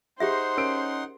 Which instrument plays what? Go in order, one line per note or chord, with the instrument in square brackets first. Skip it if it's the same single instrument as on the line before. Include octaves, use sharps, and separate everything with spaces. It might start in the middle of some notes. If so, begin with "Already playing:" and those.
[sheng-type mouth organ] D#4 F#5 C6 [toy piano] G4 G#4 E5 [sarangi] C5
[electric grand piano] C#4 D7 [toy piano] A#4